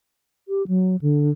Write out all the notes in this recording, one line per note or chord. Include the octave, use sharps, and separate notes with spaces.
G4
F#3
D3